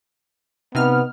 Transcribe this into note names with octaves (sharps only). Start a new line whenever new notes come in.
C3 B3 D#4 F6